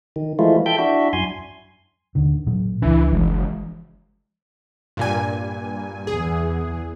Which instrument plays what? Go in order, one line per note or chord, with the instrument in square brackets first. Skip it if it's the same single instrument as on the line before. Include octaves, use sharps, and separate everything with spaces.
[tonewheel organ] D#3
E3 F3 G#3 A3 E4 F4
A4 E5 G5 G6
D4 E4 F#4 E5
F#2 G#5 C6
[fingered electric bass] D#2 D3 D#3
A1 A#2 F#3
[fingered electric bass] C#2 D4 [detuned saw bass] E3
[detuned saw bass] F#1 [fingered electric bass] E3 F3 G#3
[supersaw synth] G2 A#2 G#5
[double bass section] E2 E3 [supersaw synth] G#4